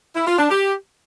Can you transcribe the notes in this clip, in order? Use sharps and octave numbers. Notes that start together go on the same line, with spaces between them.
E4
F4
D4
G4